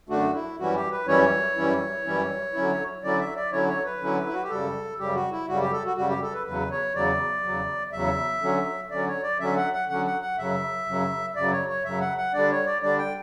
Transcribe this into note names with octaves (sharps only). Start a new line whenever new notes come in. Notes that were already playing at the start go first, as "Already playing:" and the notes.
F#2 D3 A3 D4 F#4
E4
F#2 E3 G3 C#4 E4 F#4
G4
B4
F#2 E3 G3 C#4 E4 C#5
F#2 E3 G3 C#4 E4
F#2 E3 G3 C#4 E4
D3 F#3 C#4 E4
D3 F#3 C#4 E4 D5
E5
D5
D3 F#3 C#4 E4 C#5
C#5
B4
D3 F#3 C#4 E4
E4
F#4
G4
F#2 C#3 G3 A4
F#2 C#3 G3 G4
F#4
E4
F#2 C#3 G3 F#4
G4
A4
F#4
F#2 C#3 G3 F#4
G4
A4
B4
E2 C#3 F#3 B4
C#5
E2 C#3 F#3 D5
E2 C#3 F#3
E2 C#3 F#3 E5
D3 F#3 C#4
D3 F#3 C#4 D5
C#5
D5
D3 F#3 C#4 E5
F#5
F#5
D3 F#3 C#4 F#5
F#5
F#5
F#2 C#3 F#3 E5
F#2 C#3 F#3
F#2 C#3 F#3 D5
C#5
C#5
F#2 C#3 F#3 E5
F#5
F#5
D3 G3 D4 D5
C#5
D5
D3 G3 D4 D5
G5